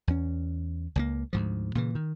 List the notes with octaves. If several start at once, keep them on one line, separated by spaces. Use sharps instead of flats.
E2 C#4
C#2 F3 A#3
D2 G#2 F3
A#2 C#3 E3
D#3